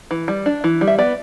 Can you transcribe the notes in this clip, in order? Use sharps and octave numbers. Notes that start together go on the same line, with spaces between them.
E3
G3
D4
E3
G3
E5
B3 D5